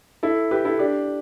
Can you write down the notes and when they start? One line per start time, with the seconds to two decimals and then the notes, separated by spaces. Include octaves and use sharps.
0.23 E4 A4
0.51 G4 B4
0.65 E4 A4
0.79 D4 G4